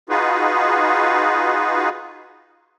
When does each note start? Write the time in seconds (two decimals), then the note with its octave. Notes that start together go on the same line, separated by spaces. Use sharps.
0.09 D#4 F4 F#4 G#4 B4